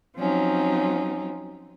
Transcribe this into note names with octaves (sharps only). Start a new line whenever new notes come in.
F3 F#3 C4 C#4 D#4